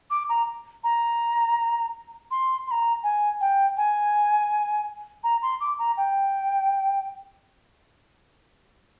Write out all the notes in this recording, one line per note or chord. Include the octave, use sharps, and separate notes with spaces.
D6
A#5
A#5
C6
C6
A#5
G#5
G5
G#5
A#5
C6
D6
A#5
G5